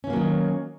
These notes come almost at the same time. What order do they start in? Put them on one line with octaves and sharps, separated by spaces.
C#4 E3 A#3 F#3 D#3